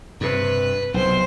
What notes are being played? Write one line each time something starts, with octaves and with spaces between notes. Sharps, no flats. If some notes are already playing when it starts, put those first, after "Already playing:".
G2 C3 B4
B1 C3 C5 C6